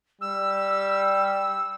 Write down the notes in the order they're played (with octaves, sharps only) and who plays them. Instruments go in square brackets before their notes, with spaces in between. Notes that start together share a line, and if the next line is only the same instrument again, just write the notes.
[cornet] G3 [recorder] E6